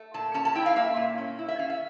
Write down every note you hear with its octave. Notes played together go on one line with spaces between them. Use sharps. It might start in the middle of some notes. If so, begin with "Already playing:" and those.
Already playing: A3
A#2 A5
C#4 A5
A5
E4 G5
F5
A#3 E5
A#2
C#4
E4
E5
C#4 F5
E5